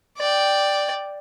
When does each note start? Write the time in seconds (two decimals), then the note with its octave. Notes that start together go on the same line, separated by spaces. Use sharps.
0.18 D5 G5